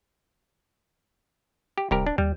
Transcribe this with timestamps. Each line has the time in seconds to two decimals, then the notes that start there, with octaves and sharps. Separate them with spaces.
1.78 G4
1.91 D1 C2 G4 A#4
2.07 D4
2.18 D#2 G3